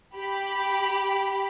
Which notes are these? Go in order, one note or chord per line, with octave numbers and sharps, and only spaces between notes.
G4 B5